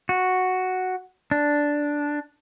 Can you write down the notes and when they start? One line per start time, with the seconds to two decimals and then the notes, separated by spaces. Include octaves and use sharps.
0.09 F#4
1.31 D4